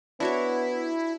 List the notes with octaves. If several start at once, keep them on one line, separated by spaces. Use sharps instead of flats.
B3 D4 E4 F#4 C#5